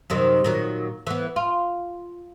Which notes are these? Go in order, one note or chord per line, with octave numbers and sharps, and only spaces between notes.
F#2 C3 D#3
A#2 D#3 F#3
E3 B3
F4